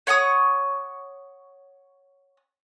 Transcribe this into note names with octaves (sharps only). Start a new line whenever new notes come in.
C#5 F#5 C#6 D#6